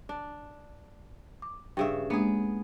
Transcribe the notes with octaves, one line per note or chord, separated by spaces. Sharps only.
D4
D6
G2 C#3 E5 G5
G#3 A#3 B3 D4 G#4